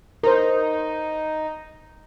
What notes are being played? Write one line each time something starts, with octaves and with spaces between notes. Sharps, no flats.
D#4 A#4 C5